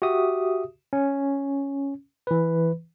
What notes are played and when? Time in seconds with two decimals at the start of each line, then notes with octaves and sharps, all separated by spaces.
0.02 F#4 G4 E5 D#6
0.93 C#4
2.27 E3 B4